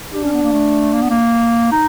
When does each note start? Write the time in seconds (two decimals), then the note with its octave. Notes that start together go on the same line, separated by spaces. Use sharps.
0.13 D4 G4
0.23 C#4
0.33 B3
0.42 A#3
0.52 A3
0.92 A#3
1.02 B3
1.09 A#3
1.72 D#4